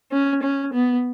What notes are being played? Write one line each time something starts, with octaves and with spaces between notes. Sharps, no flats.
C#4
C#4
B3